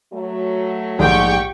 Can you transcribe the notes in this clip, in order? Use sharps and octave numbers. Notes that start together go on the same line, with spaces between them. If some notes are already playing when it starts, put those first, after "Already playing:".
F#3 A3
A#1 G#2 G4 G5 C#6